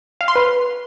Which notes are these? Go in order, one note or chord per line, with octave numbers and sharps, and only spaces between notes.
F5
C6
B4